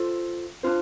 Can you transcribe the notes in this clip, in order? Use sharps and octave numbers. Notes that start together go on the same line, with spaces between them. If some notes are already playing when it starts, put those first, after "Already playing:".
Already playing: F4 A4 C5
D4 F4 C5